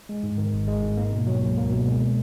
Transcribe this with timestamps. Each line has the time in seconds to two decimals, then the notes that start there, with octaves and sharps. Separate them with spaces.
0.09 G#3
0.23 G#2
0.38 D#3
0.53 G#1
0.67 G#3
0.82 G#2
0.97 A#3
1.13 B2
1.27 F#3
1.42 C#2
1.57 A#3
1.72 B2
1.86 G#3